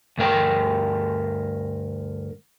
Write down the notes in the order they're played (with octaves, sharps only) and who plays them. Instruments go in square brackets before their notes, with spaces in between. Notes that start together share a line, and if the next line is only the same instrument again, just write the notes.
[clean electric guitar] D2 G2 A#4 G5